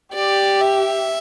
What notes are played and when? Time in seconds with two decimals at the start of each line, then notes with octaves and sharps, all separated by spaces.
0.14 G4 D5
0.61 E5